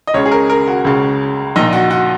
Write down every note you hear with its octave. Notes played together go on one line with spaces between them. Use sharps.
D#5
C#2 C#3 C#5
G#4
A#4
A#4
F#4
C#2 C#3
A#1 A#2 D#4
F#4
F#4